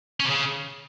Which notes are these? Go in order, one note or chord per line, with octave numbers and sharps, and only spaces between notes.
C#4
C3
C#3